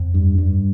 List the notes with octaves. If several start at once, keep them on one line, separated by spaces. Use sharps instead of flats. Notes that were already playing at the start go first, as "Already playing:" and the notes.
Already playing: F2
G2
G2